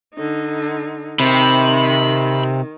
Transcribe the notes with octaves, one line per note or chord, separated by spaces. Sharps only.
D3 D#4
C3 D#3 B5